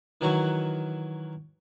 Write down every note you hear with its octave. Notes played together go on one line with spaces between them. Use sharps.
D#3 E3 F#3 F#4